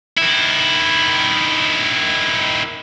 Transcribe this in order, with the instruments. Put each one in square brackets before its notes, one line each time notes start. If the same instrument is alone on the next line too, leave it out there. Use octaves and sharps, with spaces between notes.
[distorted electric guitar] D#3 E4